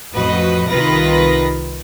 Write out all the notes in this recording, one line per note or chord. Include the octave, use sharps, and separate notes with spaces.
A1 F2 F#4 B4 D#5
C2 D#3 F4 B4 A#6